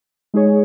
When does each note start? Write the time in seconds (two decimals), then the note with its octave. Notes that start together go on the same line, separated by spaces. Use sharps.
0.34 G#3 D#4 G#4 C#5